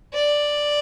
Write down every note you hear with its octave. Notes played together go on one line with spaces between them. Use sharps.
D5